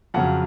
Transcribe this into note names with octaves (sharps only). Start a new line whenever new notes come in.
F2 C#3 F#3 F#5